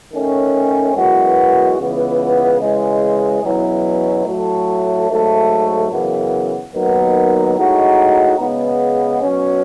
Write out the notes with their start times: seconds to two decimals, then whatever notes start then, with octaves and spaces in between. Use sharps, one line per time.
0.12 D#3 A3 C#4
0.95 F#2 E3 G#3 B3 F#4
1.77 C#2 C#3 E3 B3
2.60 C#3 E3 G#3
3.43 E2 B2 F#3 C#4 E4
4.25 A2 F#3 A3
5.09 G#2 F#3 A3
5.91 F#2 C#3 E3 B3
6.73 D#2 D#3 F#3 B3
7.56 A2 G#3 D#4 F#4
8.38 C#3 G#3 B3
9.21 B2 F#3 C#4